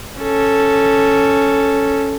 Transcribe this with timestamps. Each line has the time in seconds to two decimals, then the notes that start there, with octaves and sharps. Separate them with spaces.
0.20 C#4 A4